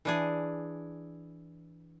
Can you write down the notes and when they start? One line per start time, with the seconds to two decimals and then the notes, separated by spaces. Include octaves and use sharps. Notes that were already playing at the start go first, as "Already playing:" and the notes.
0.05 E3 D4 G#4